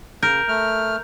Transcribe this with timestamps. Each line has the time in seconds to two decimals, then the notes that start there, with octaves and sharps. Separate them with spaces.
0.23 C#3 A#4 G6
0.48 A3 F6